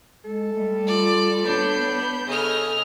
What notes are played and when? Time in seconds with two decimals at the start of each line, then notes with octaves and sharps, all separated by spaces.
0.25 G#3 A4
0.54 G3 A3
0.87 F4 D5
1.46 B3 D4 C#5 B5 G6
2.27 C#3 A4 D#5 G#5 F6